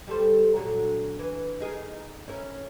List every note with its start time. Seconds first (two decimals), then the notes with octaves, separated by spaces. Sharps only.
0.07 G3 A4 C5
0.56 A#2 D3 F#3
1.19 E3
1.60 D#4 G#4 A#4
2.27 C#4 E4 A#4